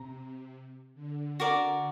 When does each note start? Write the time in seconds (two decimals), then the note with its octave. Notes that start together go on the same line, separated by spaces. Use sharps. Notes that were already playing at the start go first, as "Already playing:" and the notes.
Already playing: C3 A#5
0.94 D3
1.40 F#4 A#4 D5